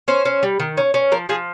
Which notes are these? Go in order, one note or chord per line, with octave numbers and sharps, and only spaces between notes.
C#4 C5
C#4
G3
D#3
C#4
C#4
F3 A#4
F3 G#4